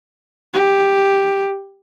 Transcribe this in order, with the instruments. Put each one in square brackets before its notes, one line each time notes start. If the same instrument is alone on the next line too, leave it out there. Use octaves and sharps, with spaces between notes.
[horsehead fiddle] G4